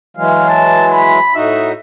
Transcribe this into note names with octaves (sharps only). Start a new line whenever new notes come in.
E3 F#3 G#3 F5
A5
B5
A2 D#4 F#4 E5